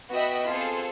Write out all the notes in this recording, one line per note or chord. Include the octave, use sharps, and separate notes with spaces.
B3 F#4 D#5 E5 G5 B5
C4 F4 G#4 A4 C5